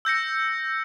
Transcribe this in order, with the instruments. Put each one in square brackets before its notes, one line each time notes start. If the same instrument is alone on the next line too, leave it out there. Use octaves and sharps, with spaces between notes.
[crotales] E6 G6 A#6 C#7